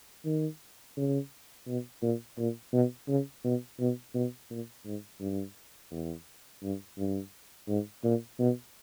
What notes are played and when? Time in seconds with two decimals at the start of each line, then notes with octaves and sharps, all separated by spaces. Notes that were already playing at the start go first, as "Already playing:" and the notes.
0.25 D#3
0.97 C#3
1.68 B2
2.02 A#2
2.38 A#2
2.73 B2
3.08 C#3
3.44 B2
3.80 B2
4.15 B2
4.50 A#2
4.85 G#2
5.21 G2
5.91 E2
6.63 G2
6.98 G2
7.68 G#2
8.04 A#2
8.39 B2